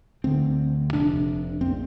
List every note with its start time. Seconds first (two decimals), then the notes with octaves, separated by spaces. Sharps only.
0.24 D2 D3 C4
0.93 F1 F2 C3 D4
1.61 A#1 A#2 C4